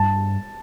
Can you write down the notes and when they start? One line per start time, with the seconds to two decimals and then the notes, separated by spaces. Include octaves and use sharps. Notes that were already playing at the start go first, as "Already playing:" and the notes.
Already playing: G2 A5